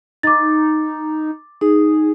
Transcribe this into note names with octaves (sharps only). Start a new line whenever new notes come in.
D#4 D6 A6
D#4 G#4